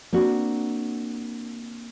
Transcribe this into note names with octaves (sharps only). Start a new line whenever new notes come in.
A#3 C4 D4 F#4